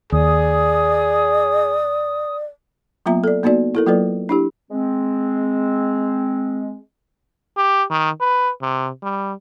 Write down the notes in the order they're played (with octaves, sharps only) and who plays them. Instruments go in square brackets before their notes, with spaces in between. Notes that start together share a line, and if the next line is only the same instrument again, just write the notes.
[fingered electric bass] D#2 [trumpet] G#4 [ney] D5 [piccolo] D#6
[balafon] F#3 A#3 B3 F4 E5 A#5
A4 D5
A#3 B3 D#4 F#4 D5
E4 A4 A#4
F#3 A#3 F4 A4 B4 D5
D4 E4 G4
[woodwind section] G#3 C4
[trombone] G4
D#3
B4
C3
G3